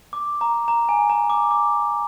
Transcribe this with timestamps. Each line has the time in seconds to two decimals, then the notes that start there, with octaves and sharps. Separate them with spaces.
0.13 D6
0.41 A#5
0.68 A#5
0.89 G#5
1.10 A#5
1.30 D6
1.51 D6